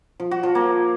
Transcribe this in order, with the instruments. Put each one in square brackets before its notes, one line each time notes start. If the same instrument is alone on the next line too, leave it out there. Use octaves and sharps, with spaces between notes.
[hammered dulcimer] F3
F#4
F3
A#3